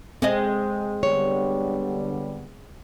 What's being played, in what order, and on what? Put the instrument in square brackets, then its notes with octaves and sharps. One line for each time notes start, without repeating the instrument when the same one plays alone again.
[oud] G#3 G#4 D#5 [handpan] C4
[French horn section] D3 G3 B3 [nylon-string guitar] C#5